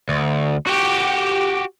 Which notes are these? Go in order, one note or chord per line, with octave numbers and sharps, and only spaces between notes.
D2
F#4 G4